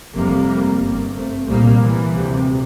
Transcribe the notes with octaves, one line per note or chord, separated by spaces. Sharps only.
F1 F2 C3 G3 A#3
G1 G2
A3 C4
C2 A#2 G3 A#3
E3
D2 C3